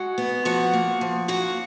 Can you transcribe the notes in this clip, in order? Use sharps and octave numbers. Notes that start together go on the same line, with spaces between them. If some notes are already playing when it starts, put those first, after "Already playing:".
Already playing: G#3 F#4 F#5
B3
F3 F#4 F#5
A#3
F3
A#3 F#4 F#5